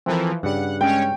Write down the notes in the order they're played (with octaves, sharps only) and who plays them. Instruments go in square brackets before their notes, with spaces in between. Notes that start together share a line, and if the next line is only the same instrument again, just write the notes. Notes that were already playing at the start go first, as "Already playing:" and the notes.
[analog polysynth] E3 F3 [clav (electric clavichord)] C4 A4 A#4
[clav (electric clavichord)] G2 C#3 G3 [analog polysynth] F#5
[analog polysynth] G#3 C#4 C#5 [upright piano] G5